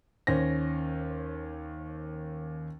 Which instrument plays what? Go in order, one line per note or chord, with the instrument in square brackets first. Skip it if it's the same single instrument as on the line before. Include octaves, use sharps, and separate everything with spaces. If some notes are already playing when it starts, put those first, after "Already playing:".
[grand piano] D#2 C#4 C5 A#6